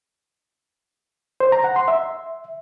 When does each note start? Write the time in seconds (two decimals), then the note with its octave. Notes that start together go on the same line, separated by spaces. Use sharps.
1.40 C5
1.52 A#5
1.64 F#5
1.76 C6
1.88 E5